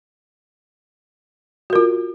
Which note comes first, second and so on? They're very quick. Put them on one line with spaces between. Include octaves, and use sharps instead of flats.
F#4 A#4 F4